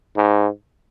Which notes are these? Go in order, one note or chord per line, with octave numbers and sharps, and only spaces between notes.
G#2